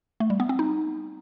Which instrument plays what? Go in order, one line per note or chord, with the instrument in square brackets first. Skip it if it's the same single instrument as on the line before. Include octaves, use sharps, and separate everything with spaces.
[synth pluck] A3
G3
B3
C4
D#4